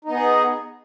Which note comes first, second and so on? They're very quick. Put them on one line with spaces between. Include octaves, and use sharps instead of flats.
D#4 B3 G#4